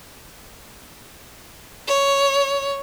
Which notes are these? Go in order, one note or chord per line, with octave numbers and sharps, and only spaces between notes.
C#5